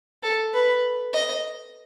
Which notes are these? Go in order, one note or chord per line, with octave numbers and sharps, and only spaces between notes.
A4
B4
D#5